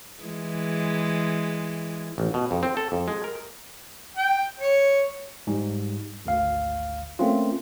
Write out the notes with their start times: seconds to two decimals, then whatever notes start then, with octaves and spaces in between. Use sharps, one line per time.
0.23 E3 G#3
2.18 A1
2.34 B2
2.51 F2
2.63 C4
2.77 A4
2.92 F2
3.08 G#3
3.24 A#4
4.17 G5
4.60 C#5
5.47 G#2 G3
6.26 G#1 D2 F5
7.19 A3 A#3 C4 C#4 F4